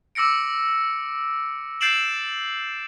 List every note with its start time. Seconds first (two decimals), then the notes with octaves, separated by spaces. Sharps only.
0.15 D6 E6 A#6 C#7 D7
1.81 G6 A6 C7 D7 E7 F#7